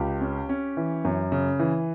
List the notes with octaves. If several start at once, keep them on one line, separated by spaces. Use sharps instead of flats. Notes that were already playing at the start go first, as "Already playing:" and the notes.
Already playing: C#2 G4
C#4
C#4
E3
F#2
C#3
E3